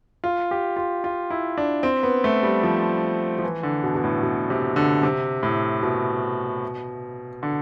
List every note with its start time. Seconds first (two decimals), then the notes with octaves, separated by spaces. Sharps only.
0.24 F4
0.51 G4
0.77 F4
1.04 F4
1.30 E4
1.58 D4
1.83 C4
2.03 B3
2.24 A3
2.43 G3
2.63 F3
3.38 F3
3.44 E3
3.63 D3
3.83 B2
3.95 B2
4.04 A2
4.23 B2
4.50 C3
4.76 D3
5.03 C3
5.43 A2
5.83 B2
7.43 D3